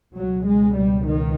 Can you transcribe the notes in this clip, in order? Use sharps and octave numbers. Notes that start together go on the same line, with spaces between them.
C#2 B2 F#3
G#3
G3
D#3